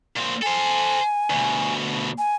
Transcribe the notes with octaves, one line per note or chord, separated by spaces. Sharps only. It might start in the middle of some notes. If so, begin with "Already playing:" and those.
A#2 C4
A4 C5 G#5
D2 B2
G#5